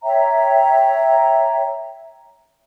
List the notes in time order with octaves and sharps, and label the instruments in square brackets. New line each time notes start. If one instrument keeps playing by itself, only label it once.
[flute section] C#5 E5 G5 A#5